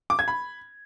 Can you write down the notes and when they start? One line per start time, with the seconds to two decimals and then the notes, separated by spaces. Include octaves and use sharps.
0.10 D6
0.19 G#6
0.28 B5